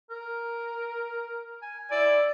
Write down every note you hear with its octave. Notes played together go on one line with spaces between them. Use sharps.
A#4
G#5
E4 D5